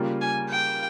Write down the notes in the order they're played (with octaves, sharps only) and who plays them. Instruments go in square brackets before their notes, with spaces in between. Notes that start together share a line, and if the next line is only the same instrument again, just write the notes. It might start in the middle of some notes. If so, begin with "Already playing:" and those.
Already playing: [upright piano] C#3 G3 A#3 F4
[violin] G#5
G5